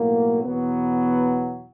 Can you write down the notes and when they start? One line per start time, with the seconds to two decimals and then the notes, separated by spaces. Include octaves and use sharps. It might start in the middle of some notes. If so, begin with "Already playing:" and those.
Already playing: B1 A2 F#3 A#3
0.43 E2 B2 F#3 B3